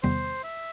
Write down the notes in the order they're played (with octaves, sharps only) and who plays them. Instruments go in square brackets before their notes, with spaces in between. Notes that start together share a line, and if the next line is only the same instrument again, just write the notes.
[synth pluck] E2 C3 D#3 G3 B3 [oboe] C5
[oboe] E5